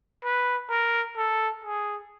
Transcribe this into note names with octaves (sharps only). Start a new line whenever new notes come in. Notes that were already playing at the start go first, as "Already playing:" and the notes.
B4
A#4
A4
G#4